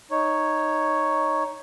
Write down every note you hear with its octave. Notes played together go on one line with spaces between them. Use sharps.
D#4 C#5